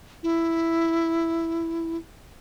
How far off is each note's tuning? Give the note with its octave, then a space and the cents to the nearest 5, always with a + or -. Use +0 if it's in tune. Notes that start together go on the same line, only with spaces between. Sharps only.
E4 +5